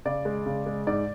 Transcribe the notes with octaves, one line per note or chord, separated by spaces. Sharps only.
C#3 D5
G#3
C#3
G#3
G#2 D5